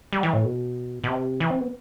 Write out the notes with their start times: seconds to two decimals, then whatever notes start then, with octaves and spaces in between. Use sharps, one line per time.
0.13 G3
0.23 E3
0.33 A2
0.45 B2
1.04 B2
1.08 C3
1.40 E3
1.51 C4
1.61 B3